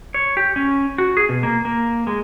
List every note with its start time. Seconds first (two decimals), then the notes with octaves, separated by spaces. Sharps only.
0.14 C#5
0.37 G4
0.56 C#4
0.98 F#4
1.17 G#4
1.29 B2
1.43 A#3
1.65 A#3
2.07 G#3